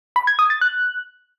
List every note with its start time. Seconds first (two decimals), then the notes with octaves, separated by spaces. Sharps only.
0.16 B5
0.27 G#6
0.39 D#6
0.50 A6
0.61 F#6